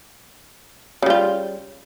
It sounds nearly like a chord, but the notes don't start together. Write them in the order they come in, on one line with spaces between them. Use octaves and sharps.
C#3 G3 F4